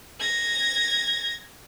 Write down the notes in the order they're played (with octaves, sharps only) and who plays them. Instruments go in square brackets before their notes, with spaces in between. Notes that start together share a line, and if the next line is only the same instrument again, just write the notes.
[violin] G#6 A#6